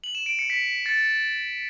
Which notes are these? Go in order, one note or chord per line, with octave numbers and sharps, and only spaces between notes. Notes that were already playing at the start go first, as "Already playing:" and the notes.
F#7
E7
D7
C#7
B6
A6 C#7